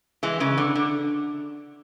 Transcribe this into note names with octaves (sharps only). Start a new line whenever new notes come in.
E3 G#3
C#3 E3
D3
D3